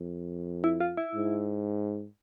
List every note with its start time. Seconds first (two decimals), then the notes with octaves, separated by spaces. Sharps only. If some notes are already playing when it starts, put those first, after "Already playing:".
Already playing: F2
0.64 E4
0.80 F4
0.97 E4
1.15 G#2